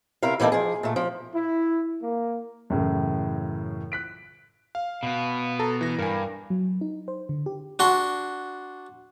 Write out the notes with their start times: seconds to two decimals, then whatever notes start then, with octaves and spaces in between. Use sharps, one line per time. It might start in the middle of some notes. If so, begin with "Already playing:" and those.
0.23 C3 E4 A#4 F5
0.40 E3 G3 A#3 D#4 A4
0.52 F3 G#4
0.83 A#2 A3
0.96 F3
1.34 E4
2.02 A#3
2.70 F#2 A2 C#3 E3
3.92 F#6 B6 D7
4.75 F5
5.03 B2 B3
5.59 A4 A5 A#5
5.81 E3 A#6
5.99 G2 A#4 G#5
6.50 F#3
6.81 D#4
7.08 C5
7.29 D3
7.46 G4
7.79 D4 F#4 C6